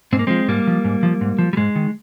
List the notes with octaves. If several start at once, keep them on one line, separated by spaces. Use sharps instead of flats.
G#2 C4
A#3
F3 G#3 C4
G#2 G3 A#3
F3
G#2
F3
G#2
F3
G3
G#2 G#3
D#3